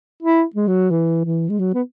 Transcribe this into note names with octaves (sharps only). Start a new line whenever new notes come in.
E4
G#3
F#3
E3
E3
G#3
F#3
B3